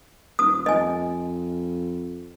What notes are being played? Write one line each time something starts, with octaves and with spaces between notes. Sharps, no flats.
D#1 D#6
F2 D#5 G#5